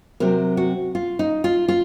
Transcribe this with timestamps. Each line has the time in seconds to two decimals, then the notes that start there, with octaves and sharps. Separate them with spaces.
0.20 C3 F#3 C4 A#4
0.57 F#4
0.95 F4
1.19 D#4
1.44 F4
1.68 F4